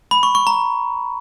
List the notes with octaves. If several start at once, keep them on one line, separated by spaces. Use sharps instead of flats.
B5
C#6
C#6
A#5